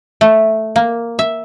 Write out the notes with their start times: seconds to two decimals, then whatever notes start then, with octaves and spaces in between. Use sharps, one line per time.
0.21 A3
0.76 A#3
1.19 E5